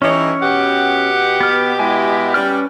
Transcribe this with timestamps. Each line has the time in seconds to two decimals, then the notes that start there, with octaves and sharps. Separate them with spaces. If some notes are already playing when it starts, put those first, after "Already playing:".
0.02 G2 E3 C#4 D#4 E4 C#5
0.42 B2 G4 F#5
1.41 B3 F6
1.79 G#3 B3 E4 E5 G#5
2.34 G3 C#4 B4 F6